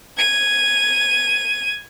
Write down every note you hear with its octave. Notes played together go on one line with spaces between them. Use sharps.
G#6 D#7